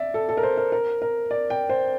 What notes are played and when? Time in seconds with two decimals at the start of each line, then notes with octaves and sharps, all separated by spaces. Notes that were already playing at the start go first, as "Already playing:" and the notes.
Already playing: D5 E5
0.14 A4
0.29 A4
0.37 A#4
0.43 C5
0.58 A#4
0.72 A#4
1.02 A#4
1.31 D5
1.50 G5
1.69 C5